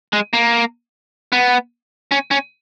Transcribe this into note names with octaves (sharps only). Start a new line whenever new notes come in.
G#3
A#3
B3
C#4
C#4